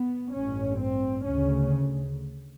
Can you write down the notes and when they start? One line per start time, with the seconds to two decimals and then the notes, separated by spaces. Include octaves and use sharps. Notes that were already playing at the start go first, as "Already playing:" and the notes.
Already playing: B3
0.34 A1 G2 C#4
0.80 C4
1.27 D2 C#3 C#4